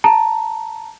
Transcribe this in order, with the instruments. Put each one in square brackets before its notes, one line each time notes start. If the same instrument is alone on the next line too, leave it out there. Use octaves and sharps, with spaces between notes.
[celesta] A5 A#5